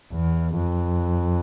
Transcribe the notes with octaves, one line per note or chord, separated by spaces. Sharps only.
E2
F2